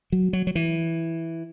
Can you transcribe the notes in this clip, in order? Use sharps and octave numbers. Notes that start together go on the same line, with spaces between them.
F#3
F#3
F#3
E3